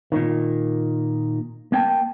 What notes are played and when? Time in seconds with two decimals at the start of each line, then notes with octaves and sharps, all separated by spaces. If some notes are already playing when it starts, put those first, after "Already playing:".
0.12 A#2 D#3
1.72 A#3 G5 A5